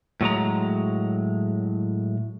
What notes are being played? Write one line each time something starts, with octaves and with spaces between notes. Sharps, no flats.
A2 F#3 G#3 A#5